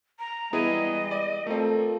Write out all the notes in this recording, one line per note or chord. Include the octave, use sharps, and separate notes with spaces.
A#5
E3 G3 G#3 B3 E4 G#4 D#5
D5
A3 C4 F4 A4 A#4